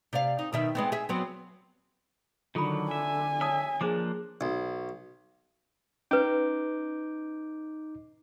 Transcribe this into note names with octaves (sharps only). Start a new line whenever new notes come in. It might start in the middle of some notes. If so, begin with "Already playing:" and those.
C3 D5 F5
D#4
B2 D#3 E5
G#3 B3 C4
G#4 E5
F#3 B3 C4
D3 D#3 F#3 F4 A4 B5
E5 G#5
C#5 E5 A5 D#6
F3 A#3 D4 G#4 C5 D6
B1
C#4 D#4 B4 D6 G6